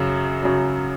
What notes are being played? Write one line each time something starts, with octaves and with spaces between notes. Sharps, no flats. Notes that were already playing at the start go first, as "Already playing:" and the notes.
Already playing: F#2 C#3 F#3
C#3 F#3